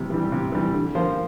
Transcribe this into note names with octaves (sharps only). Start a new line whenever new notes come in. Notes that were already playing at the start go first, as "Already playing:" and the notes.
Already playing: C3 E3 G3
E3 G3
C3
E3 G3
D3
F3 A#3 F4 C5